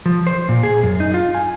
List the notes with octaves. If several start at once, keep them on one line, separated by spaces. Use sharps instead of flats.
F3
C5
A#2
G#4
F#2
D#4
F4
G#5